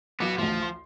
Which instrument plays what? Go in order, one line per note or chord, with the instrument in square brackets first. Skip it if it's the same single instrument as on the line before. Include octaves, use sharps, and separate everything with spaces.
[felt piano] B1 D6 [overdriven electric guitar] B3 F#4
[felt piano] A1 D2 [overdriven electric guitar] F3
[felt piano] C6